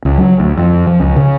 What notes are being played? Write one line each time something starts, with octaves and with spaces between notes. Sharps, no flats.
C#2
F#3
D2
F2
F3
C#2
C#3